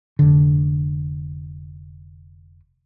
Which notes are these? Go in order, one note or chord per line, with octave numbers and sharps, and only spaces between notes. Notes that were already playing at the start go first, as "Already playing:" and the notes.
F1 D3